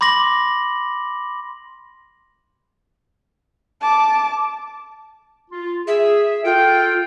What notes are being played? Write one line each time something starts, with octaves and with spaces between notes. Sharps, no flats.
B5 C6 D6 A#6 F#7
A5 D6
F4
G#4 E5
F4 A4 G5